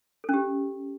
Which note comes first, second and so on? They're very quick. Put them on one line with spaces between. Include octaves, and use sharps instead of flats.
A4 C#4 G4